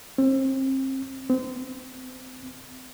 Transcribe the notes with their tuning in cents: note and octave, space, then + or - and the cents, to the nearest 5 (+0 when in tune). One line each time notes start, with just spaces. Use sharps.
C4 +35
C4 -30